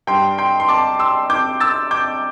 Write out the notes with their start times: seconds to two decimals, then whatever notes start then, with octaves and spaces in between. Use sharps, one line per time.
0.07 G2 G3 G5 C6
0.38 G5 C6
0.60 C6
0.69 A5 D6
0.99 C6 E6
1.30 D6 G6
1.60 E6 A6
1.91 D6 G6